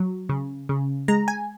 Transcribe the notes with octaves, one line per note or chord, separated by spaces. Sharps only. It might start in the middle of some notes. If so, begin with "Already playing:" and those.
Already playing: F#3
C#3
C#3
G#3 A#5
G#5